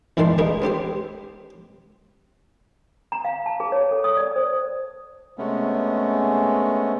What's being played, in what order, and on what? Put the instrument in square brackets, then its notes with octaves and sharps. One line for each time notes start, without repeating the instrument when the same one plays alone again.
[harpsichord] E2 G#2 D#3 D5 A5 C6
A#3 B3 D#4 G#4
B3 C4 G4 C5
[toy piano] A#5
F5
A5
G#4
C#5
A4
D#6
D5
C5
[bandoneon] C3 G#3 A3 B3 C#4